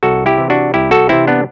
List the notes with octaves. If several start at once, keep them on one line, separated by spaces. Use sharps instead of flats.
C2 F#4 A4
E4 G4
C3 E3
D4 F#4
C2 E4 G4
F#4 A4
C3 E3 C4 E4
B3 D4